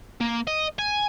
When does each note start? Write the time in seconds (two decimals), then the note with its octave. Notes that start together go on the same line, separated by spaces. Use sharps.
0.21 A#3
0.47 D#5
0.79 G#5